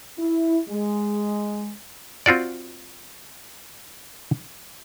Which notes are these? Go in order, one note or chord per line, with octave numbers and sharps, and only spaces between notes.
E4
G#3
C4 F4 F#4 D5